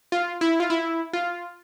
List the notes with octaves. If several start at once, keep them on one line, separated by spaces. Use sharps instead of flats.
F4
E4
F4
E4
F4